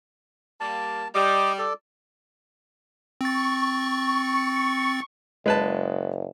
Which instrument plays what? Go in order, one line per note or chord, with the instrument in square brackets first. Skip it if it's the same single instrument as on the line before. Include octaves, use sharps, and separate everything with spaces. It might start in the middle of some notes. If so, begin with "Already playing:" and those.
[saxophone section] G3 A#3 [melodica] A5
[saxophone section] G3 [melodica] D#5 D6
[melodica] A4 D5
[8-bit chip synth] C4 A6 [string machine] C#6
[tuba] F#1 [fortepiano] G#3 B4 A5